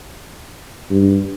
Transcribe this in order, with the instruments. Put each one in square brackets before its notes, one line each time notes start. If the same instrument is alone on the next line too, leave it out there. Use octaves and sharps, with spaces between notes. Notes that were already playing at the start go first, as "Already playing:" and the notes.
[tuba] G2